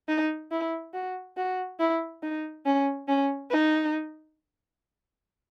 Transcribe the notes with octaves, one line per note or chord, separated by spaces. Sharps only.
D#4
E4
F#4
F#4
E4
D#4
C#4
C#4
D#4